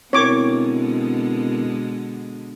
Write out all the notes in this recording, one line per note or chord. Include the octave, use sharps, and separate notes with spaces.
B2 D3 G#3 C4 E4 A#4 C#5 D6